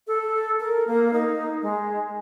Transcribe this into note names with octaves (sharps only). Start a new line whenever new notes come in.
A4
A#4
A#3
D#4
G#3